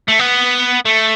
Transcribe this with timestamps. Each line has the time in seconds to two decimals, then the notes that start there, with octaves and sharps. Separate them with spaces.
0.08 A3
0.19 B3
0.85 A3